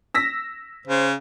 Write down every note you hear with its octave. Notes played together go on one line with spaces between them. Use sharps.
E6 A#6 B6
C#3 C5